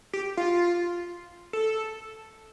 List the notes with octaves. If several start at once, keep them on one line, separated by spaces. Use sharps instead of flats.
G4
F4
A4